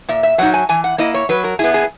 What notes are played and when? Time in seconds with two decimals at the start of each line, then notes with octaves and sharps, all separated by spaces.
0.09 A#2 E5
0.23 E5
0.38 F#3 A#3 D#4 F#5
0.54 G#5
0.69 E3 G#5
0.84 F#5
0.98 A#3 E4 D#5
1.14 C#5
1.29 F#3 B4
1.44 A#4
1.59 B3 E4 G#4
1.74 G#4